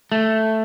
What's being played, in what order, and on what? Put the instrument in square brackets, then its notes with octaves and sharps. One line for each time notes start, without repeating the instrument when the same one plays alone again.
[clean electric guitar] A3